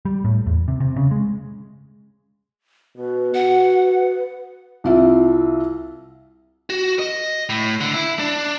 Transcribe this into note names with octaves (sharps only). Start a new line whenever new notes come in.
G3
A2
E2
C3
C3
C#3
G#3
B2 B4
F#4 F#5
C2 F4 E5
F#4
D#5
A2
D3
E4
D4